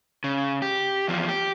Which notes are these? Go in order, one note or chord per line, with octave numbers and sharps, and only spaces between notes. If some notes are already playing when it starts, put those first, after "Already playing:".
C#3
G4
E2 F3
G4